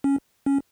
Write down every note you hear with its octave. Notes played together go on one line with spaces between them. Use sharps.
C#4
C#4